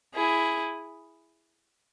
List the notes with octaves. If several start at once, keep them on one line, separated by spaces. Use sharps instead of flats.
E4 G#4